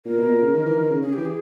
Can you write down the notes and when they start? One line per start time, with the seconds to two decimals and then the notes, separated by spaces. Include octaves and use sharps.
0.05 A#2 A#4
0.18 B2
0.30 A#2
0.42 C#3
0.54 D#3
0.66 E3
0.77 D#3
0.90 C#3
1.02 C#3 G#4
1.13 E3 G4
1.25 G#4